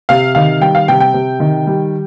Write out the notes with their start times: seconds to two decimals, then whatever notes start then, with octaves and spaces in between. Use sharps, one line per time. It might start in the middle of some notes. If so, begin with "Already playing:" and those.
0.09 C3 F5
0.35 D#3 F5
0.62 G3 G5
0.75 F5
0.88 C3 G5
1.00 G5
1.14 C3
1.40 D#3
1.67 G3